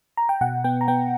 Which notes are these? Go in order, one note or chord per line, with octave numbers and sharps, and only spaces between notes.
A#5
G5
B2 F#5
B3 G5
A#5
B3 G5